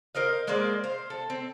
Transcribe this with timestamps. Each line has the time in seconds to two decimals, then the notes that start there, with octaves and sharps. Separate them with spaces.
0.15 A#4 C5 D#5 F5
0.47 G#3 A#3 C5 D5
0.84 C5 F5
1.10 A4
1.30 C4